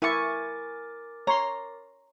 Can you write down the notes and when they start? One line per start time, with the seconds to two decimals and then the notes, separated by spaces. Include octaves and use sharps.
0.02 E4 A#4 G#5 C#6 D6 A6
1.27 C#5 A#5 C6